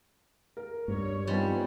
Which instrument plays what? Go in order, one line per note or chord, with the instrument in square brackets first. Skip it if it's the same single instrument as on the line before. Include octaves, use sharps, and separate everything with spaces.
[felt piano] A#4
[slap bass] G2 [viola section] C#5
[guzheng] G3 [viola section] B3 C4 [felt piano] D#4 F4 G#5